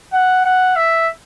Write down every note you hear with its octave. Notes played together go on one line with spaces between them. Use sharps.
F#5
F#5
E5